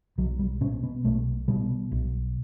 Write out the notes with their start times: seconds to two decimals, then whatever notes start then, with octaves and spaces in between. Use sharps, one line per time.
0.18 B1 F#3
0.39 G3
0.61 B2 C#4
0.83 B3
1.04 B1 A3
1.48 B2 G3
1.92 B1